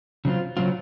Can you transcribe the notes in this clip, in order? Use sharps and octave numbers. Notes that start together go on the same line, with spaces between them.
C#3 F#3 C4 F4
C#3 F#3 C4 F4